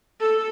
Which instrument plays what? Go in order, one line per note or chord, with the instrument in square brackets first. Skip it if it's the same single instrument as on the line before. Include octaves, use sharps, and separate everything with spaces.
[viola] A4